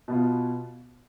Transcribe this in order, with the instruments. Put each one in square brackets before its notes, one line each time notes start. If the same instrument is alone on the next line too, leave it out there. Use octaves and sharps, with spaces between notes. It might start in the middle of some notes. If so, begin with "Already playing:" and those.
[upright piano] B2 B3 F4